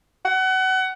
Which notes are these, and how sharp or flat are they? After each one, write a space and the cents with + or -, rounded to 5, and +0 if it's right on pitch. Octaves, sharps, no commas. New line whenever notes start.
F#5 +30